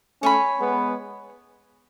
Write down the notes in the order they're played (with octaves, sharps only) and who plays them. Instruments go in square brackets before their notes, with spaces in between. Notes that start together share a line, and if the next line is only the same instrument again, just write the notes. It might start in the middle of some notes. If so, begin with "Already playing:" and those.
[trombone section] A3 C#4 [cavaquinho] C#5 G#5 B5
[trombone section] G#3 B3